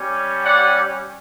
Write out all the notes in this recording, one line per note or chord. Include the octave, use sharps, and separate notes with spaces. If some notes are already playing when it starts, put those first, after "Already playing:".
Already playing: G3 C#4 G4
D5 F#5